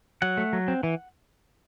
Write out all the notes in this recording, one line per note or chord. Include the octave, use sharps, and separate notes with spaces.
F#3 F#5
A3
F#3
C4
E3